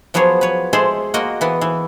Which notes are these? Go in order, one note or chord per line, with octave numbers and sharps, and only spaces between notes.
F3 F#3 B3 G#4 C#5
B4 C#5
G#3 G#4 A4 C5 D5 E5
A#3 F#4 A#4 D#5
E3 B3
E3